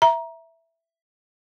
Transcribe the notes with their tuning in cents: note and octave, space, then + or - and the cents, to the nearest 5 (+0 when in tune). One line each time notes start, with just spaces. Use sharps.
E5 +5 A#5 +20